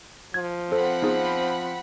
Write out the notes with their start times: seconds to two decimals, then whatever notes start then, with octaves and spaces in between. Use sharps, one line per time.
0.34 F3 G#6
0.72 C4 A4 C5 F#5 B5
1.02 B3 D#4 G#4